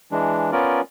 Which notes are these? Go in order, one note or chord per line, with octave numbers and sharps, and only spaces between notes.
E3 G#3 D4
B3 C#4 F4 A#4 D5